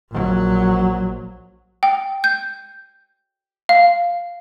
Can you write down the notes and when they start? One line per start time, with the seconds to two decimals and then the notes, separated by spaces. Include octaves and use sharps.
0.11 A#1 F#3
1.83 G5
2.24 G6
3.69 F5